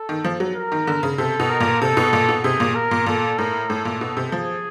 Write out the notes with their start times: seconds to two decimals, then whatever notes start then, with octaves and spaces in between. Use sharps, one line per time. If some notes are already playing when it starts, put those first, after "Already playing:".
Already playing: A4
0.09 D#3
0.25 F3
0.40 F#3
0.55 A#4
0.72 D#3
0.87 D3
1.03 C#3
1.18 C3 A4
1.40 B2
1.50 A#4
1.60 A#2
1.81 C3 A4
1.97 B2
2.13 A#2
2.29 B2
2.44 C3 G#4
2.60 A#2
2.75 A#4
2.91 A#2
3.06 A#2 A4
3.38 A2 A#4
3.69 A2 A4
3.85 A#2
4.01 B2
4.17 C3
4.32 F3 G#4